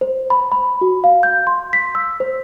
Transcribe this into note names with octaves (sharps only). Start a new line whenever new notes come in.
C5
B5
B5
F#4
F5
G6
C6
B6
E6
C5